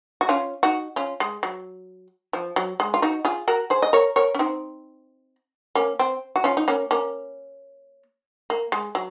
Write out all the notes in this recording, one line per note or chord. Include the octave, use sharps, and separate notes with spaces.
F#4
C#4 F4
D#4 F#4
C#4 F4
G#3
F#3
F3
F#3
G#3
F4
D#4 F#4
F4 G#4
F#4 A#4
G#4 C5
D#5
A#4 C#5
A#4 C#5
C#4
C4 D#4
A#3 C#4
C4
F#4
C#4 F4
D#4
A#3 C#4
A#3 C#4
A#3
G#3
F#3